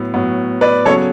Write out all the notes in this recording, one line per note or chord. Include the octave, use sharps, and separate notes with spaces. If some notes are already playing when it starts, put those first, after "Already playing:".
Already playing: A2 F#3 B3
A2 F#3 B3
B4 D5
C#3 F#3 B3 A4 C#5